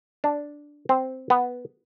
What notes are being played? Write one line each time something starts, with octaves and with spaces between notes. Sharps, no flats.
D4
C4
B3